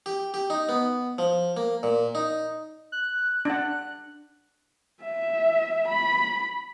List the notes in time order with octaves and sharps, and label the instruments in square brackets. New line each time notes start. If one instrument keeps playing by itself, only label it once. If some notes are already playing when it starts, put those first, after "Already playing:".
[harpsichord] G4
G4
D#4
B3
F3
A#3
A#2
D#4
[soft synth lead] F#6
[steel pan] D4 F#5
[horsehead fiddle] E5
B5